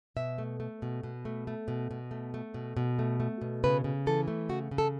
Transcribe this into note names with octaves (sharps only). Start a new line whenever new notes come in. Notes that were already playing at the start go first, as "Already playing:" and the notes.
B2 E5
A3
A3
B2
B2
A3
A3
B2
B2
A3
A3
B2
B2
A3
A3
B2
C#3 B4
C#3
E3 A4
A3
C#3 F#4
C#3
A4